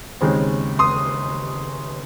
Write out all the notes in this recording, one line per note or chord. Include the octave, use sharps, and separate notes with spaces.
D#2 C#3 G#3 C4 D#4
C6 D#6